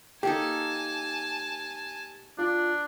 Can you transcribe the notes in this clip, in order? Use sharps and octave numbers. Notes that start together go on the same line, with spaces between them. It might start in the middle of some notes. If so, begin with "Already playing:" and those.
A#3 D#4 G4 A4 G#5 A5
D4 F4